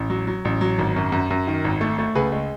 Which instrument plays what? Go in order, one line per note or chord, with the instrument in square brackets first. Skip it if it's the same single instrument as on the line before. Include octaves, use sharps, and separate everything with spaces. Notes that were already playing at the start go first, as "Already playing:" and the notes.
Already playing: [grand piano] A1
F#3
F#3
A1
F#3
G#1
F#2
F#2
F#2
D#3
G#1
A3
A3
C#2 G#4 B4
G#3